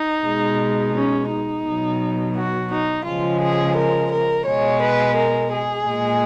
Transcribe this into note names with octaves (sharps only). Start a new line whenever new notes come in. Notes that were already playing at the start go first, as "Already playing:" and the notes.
Already playing: D#4
B2 G#3
C#4
D#4
B2 F#3
F#4
D#4
C#3 F3 G#3 F4
G#4
A#4
A#4
B2 G#3 C#5
B4
A#4
G#4
A#2 G#3